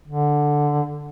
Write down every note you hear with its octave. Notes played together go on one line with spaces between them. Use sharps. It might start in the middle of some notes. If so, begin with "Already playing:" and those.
D3